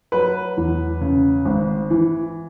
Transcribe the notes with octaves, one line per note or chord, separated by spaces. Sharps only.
F#3 B4
E2
C#3
G#1
E3